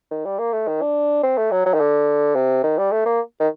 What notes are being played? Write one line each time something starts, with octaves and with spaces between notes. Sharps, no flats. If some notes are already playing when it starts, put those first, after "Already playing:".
D#3
G3
A#3
A3
D#3
D4
C4
A3
F#3
F#3
D#3
D3
C3
D#3
G3
A3
A#3
D#3